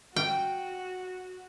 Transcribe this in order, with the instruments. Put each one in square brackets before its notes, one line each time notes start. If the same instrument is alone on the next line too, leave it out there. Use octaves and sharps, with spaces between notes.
[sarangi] F#4 [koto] G5